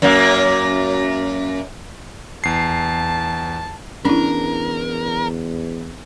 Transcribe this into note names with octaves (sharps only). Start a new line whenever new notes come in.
F#2 A#3
E2 A5 C7
E2 C#4 D4 E4 A#4